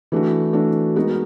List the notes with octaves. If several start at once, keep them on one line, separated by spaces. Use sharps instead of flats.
E3 A3 D4 F#4
E3 A3 D4 F#4
G#3 B3 D#4 F#4 A#4